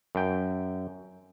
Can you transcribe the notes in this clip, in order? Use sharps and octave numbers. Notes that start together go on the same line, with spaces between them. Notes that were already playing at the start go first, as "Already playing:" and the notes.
F#2 G5